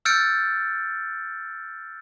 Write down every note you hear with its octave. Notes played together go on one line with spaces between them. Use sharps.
E6 F6 G6 A6 C#7 D7